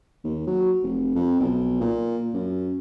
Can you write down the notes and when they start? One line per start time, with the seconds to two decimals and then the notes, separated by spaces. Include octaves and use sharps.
0.24 D#2
0.47 F#3
0.83 F1
1.15 F2
1.40 B1
1.81 A#2
2.34 F#2